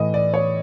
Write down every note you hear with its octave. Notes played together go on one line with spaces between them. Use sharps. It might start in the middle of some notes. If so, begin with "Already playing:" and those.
Already playing: A2 E3 D#5
D5
C#5